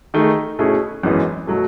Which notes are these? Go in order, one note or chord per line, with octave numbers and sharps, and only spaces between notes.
D#3 A3 D#4 G#4
B2 A3 C#4 E4 G#4
G#1 F#2 E3 G#3 B3
B2 F#3 A3